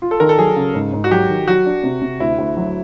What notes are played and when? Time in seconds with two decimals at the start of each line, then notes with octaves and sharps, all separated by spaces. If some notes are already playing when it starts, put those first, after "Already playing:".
0.02 F4
0.11 A4
0.20 D#3 A#4
0.29 A4
0.38 F#3 G#4
0.56 C#3
0.75 G#2
0.93 G#2
1.04 F#4
1.11 F#3 G4
1.29 D#3
1.47 F#3 F#4
1.66 D4
1.84 C3
2.02 C3
2.20 D2 E4
2.38 D2
2.56 F#3